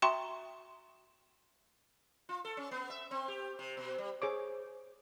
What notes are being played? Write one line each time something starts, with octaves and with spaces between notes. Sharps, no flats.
F#4 E5 G5 A#5 C6 C#6
F4
A4
C#4
B3
E5
C4
G4
C3
B2
G3
G#4 C5 C#5 D6